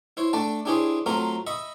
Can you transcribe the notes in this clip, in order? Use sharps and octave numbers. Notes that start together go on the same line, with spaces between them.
E4 C5 C#5
A3 D4 D5 G5 A5
D4 E4 G4 G#4 C5 C#5
F#3 A3 C4 F4 A#4 C5
D#5 E5 B5 C#6